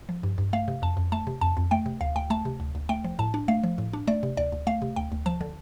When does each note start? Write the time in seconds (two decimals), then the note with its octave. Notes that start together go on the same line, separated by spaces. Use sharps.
0.09 F3
0.23 G2
0.38 G2
0.53 A3 F5
0.68 C3
0.82 F2 A5
0.97 F2
1.12 A3 A5
1.27 C3
1.41 F2 A5
1.57 F2
1.71 A3 G5
1.86 C3
2.01 D2 F5
2.16 D2 G5
2.30 A3 A5
2.45 C3
2.60 D2
2.75 D2
2.89 A3 G5
3.04 F3
3.19 A2 A5
3.34 D4
3.48 A3 F5
3.64 F3
3.78 A2
3.93 D4
4.07 A3 D5
4.23 C3
4.37 D2 D5
4.52 D2
4.67 A3 F5
4.82 C3
4.96 D2 G5
5.12 D2
5.26 F3 A5
5.41 D3